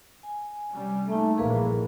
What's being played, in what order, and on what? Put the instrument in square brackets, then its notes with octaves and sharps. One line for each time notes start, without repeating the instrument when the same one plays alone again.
[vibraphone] G#5
[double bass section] C3 G3 C#4
[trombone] A3 [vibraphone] A#3 D#4
[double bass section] A#1 G2 E3 [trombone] A#3 [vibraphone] G#4 B4